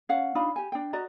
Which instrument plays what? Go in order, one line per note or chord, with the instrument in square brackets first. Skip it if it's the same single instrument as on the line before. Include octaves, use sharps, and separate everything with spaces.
[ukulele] C#4 F5 F#5
D4 D#4 F4 B5
G4 G#5
D4 G5
F#4 D5 D#5 A#5